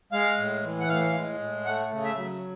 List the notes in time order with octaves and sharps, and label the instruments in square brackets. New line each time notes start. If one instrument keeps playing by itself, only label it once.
[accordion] G#3 F5
A2
E3
F#5
A2 F5
G#3
A2
A3 F#5
C#3
E5
F#3